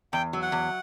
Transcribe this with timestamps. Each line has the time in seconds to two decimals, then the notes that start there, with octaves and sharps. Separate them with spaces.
0.13 E2 G5
0.33 F#3
0.42 F#5
0.52 E2